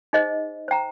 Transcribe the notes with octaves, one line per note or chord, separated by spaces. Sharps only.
D#4 G#4 C5 D#5
C5 G5 A#5